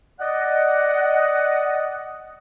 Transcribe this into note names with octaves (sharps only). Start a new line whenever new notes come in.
D5 D#5 F#5